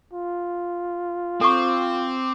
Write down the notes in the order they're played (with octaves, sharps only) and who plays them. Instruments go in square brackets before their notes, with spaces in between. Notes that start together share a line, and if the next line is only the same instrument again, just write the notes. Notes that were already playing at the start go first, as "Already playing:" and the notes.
[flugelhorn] F4
[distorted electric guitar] C4 [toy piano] A4 C#6 [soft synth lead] D6